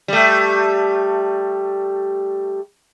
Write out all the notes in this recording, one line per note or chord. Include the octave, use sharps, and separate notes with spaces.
G3 A3